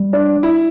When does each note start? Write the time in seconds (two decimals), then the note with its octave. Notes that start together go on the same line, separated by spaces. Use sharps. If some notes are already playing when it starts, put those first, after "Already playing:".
Already playing: G3
0.13 D4
0.43 E4